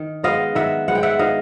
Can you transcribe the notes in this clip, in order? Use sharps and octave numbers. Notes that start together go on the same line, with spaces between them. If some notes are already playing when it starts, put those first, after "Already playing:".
Already playing: D#3
G#3 B3 D#5 F5
D#3 E5 F#5
G#3 B3 F#5
G5
E5 F#5
D#3 D#5 F5